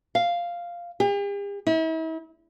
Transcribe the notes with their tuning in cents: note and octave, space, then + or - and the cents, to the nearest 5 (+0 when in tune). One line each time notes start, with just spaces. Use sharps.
F5 -5
G4 +45
E4 -40